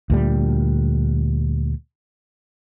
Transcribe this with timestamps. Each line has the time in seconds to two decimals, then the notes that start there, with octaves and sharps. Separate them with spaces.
0.10 D2 A#2 G3